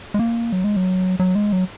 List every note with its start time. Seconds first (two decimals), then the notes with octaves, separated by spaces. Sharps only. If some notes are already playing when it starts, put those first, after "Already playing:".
0.14 G#3
0.19 A#3
0.52 F#3
0.64 G#3
0.76 F#3
1.20 F#3
1.35 G#3
1.52 F#3